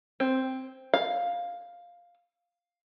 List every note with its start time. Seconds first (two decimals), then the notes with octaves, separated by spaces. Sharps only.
0.20 C4
0.94 F5